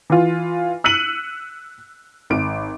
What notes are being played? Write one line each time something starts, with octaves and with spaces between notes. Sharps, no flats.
E3 F4
E6 F#6 B6 C#7 D#7 F#7
G#1 D7